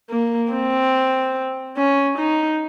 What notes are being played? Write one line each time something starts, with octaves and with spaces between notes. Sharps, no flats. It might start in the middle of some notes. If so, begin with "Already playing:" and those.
A#3
C4
C#4
D#4